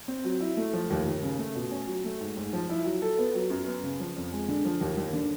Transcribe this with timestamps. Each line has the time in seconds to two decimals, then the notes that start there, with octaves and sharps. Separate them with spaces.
0.08 C4
0.24 F#3
0.40 E4
0.57 A3
0.73 F3
0.90 D#2
1.06 D#2
1.23 C#3
1.38 A3
1.55 B2
1.71 C#4
1.87 F#3
2.05 A3
2.20 G#2
2.37 G#2
2.53 F3
2.69 E4
2.85 F#3
3.02 A4
3.18 B3
3.35 F#3
3.50 F#2
3.66 B3
3.83 C#3
4.00 F3
4.16 F2
4.32 G#3
4.48 D3
4.65 F3
4.81 D#2
4.97 D#2
5.13 D3